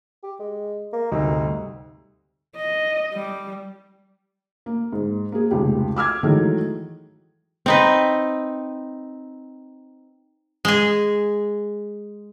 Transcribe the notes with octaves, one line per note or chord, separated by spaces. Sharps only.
G4
G#3
A#3
D2 G2 C3 D#4
D#5
G3
A#3
G#2
A#3 G#4
F1 C#2 G4
D6 E6 F6 G#6
D#3 E3 F#3 G#3 A3
C4 D#4 B4
G#3 G#4